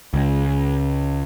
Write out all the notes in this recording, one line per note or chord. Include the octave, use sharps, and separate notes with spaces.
C#2